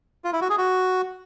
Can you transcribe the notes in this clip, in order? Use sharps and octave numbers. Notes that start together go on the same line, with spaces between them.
F4
E4
F#4
G#4
F#4